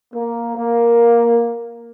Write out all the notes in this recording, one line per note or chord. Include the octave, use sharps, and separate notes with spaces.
A#3
A#3